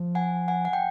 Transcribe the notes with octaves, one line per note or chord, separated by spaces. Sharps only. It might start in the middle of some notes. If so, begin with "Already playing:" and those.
Already playing: F3
F#5 G#5
F#5 G#5
F#5
G5